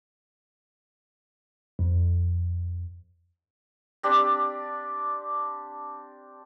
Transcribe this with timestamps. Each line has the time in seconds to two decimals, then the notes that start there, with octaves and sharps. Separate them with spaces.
1.79 F2
4.03 C4 D4 G4 D5